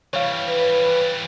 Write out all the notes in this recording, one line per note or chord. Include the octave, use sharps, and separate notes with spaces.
E3 G3 C#5 F5
B4